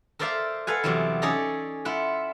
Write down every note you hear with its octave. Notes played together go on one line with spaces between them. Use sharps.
A4 A#4 C5 D5 E5 F5
A4 B4 F5 F#5 G#5
E2 C3 F#3 G3 E4
C#4 D#4 G#4 A4 D5 A#5
E4 F4 F#5